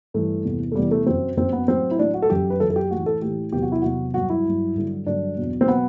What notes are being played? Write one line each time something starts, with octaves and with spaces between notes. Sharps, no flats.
G2 E3 A3
E2 C3 E3
A3
E2 C3 E3 G3
A3
F#2 F#3 C4
F#2 F#3 C4
B3
A2 F#3 C4
E4
A2 F#3 D4
F#4
A4
F#2 F#3 G4
B4
F#2 F#3 A4
A4
G4
A2 E3 F#4
A4
A2 E3 G4
E2 C3 F#3 G4
F#4
E4
E2 C3 F#3 F#4
G2 F#3 F#4
E4
G2 F#3
G2 D3 F#3
G2 D3 F#3 D4
E2 B2 F#3
C4
B2 F#3 B3